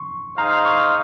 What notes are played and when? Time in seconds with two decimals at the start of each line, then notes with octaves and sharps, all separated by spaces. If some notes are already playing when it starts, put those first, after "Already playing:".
Already playing: C6 C#6
0.38 D#4 G#4 C5 F5 A#5
0.65 C#6